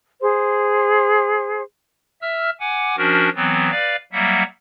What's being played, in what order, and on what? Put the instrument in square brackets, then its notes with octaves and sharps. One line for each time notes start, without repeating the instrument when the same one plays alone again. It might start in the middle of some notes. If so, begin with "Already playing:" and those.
[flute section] G#4 C5
[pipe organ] E5 E6 F6
F#5 G#5 D6
F3 C#4 D4 F#4 A#4
E3 F#3 B3 C4
B4 D5 F5
F#3 G3 A#3 E5 F#5